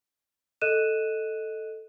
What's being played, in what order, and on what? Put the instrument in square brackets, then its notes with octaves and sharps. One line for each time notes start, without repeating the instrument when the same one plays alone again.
[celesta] A4 D#5 F#6 D#7 E7